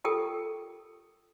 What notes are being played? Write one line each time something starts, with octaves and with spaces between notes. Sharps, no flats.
F4 G4 A4 A#4 G5 D#6